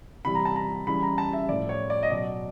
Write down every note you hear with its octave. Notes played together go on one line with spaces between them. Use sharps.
C3 E3 G3 B5
A#5
A5
A#5
C#3 E3 G3 B5
A#5
A5
E5
A2 F3 D5
C#5
D5
D#5
B2 F#3 D5